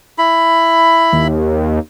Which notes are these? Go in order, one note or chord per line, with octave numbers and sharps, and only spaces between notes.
E4 B5
D#2